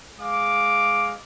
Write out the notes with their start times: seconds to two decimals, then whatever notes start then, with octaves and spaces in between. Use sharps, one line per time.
0.20 G#3 F5 D6